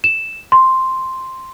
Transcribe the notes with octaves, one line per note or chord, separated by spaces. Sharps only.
E7
C6